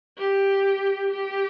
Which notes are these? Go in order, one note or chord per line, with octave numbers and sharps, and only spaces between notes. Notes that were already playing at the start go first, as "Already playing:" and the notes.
G4
G4